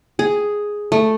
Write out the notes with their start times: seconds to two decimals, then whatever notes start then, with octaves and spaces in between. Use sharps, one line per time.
0.19 G#4
0.92 A3